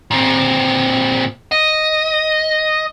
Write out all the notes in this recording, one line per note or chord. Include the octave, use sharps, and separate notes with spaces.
A#2 C4
D#5